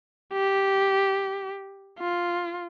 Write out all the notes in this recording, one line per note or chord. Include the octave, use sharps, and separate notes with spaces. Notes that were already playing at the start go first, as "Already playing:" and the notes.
G4
F4